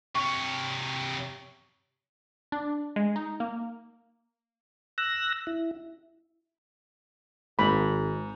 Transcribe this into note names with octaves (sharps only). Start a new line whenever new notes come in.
C3 C#5 C#6
D4
G#3
D#4
A#3
E6 F#6 A#6
E4
G#1 G#2 B5